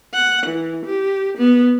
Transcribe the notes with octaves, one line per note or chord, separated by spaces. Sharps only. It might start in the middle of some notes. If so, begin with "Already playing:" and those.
F#5
E3
G4
B3